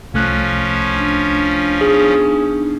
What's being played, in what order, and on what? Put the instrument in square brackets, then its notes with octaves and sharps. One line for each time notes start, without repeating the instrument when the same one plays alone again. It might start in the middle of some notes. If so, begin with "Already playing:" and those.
[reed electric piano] C2 A3 F#6 [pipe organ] F3 C#4
[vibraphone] D4
[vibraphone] B3 D4 D#4 [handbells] G#4